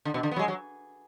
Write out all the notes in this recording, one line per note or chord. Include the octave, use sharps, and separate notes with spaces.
D3
B2
D3
B3
F#3
G#3
F#3